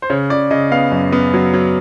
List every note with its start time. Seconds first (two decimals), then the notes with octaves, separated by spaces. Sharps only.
0.02 C5
0.10 C#3 C#5
0.30 C#3 D5
0.51 C#3 D#5
0.71 B3 F5
0.92 F#2
1.12 B3
1.34 F#3
1.54 F#3